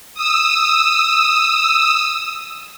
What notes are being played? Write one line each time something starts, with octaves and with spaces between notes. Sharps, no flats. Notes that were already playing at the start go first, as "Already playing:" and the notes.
D#6 E6